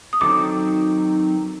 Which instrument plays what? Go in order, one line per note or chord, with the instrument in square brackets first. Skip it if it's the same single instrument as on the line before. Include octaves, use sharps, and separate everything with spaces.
[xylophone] D#6
[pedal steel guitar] D#3 F#3 C4 D#4 A4 [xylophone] D6